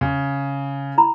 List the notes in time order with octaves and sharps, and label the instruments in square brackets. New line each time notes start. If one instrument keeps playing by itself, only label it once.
[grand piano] C#3
[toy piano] E4 A#5 B5